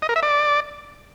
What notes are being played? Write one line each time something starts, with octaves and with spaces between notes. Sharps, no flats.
D#5
A#4
E5
D5